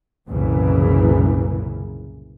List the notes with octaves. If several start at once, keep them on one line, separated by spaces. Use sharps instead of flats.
C2 F#2 A#2 C#3 E3